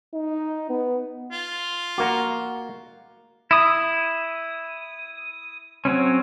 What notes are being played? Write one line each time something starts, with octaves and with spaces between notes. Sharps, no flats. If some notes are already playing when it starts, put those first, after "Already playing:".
D#4
B3
F4
A#3 F#4 F#5 A#5 D6
E4 D#6
F#3 C4 C#4